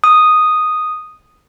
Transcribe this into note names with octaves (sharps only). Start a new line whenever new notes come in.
D#6